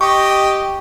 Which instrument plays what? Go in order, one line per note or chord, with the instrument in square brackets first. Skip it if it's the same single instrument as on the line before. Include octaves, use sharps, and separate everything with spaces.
[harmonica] G4 D#5 [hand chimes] C#6